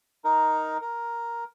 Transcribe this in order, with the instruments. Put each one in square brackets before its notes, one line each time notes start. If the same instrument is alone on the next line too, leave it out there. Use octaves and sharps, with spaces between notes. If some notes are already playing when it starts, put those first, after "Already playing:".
[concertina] D#4 A#4
A#4